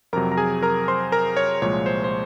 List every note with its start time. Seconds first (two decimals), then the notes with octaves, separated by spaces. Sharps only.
0.13 F2 C3 F#3 A#4 A#5
0.32 A#5
0.37 G#4 G#5
0.63 A#4 A#5
0.88 C5 C6
1.12 A#4 A#5
1.37 C#5
1.62 C2 A#2 F3 G#3 C#5
1.86 C5
2.04 C5